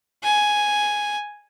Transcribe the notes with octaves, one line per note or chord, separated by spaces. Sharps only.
G#5